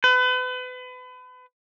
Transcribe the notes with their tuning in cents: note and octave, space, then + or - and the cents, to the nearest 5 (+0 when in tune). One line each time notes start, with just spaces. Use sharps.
B4 +35